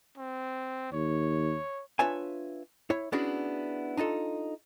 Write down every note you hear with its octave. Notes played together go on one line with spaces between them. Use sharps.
C4
D#2 C#5
D4 F4 B4 C#5 E5 G#5
E4 C#5
B3 C#4 D4 E4 F#4 G#4
D4 D#4 F4 A4